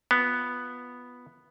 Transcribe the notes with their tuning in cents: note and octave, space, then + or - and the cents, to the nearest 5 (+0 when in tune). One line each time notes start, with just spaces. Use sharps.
B3 +0 F4 +0